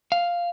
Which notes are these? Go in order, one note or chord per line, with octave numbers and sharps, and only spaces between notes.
F5